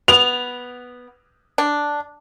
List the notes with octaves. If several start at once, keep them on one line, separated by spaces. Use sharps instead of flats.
B3 F7
D4